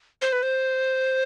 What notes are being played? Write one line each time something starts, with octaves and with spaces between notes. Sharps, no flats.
C5
B4
C5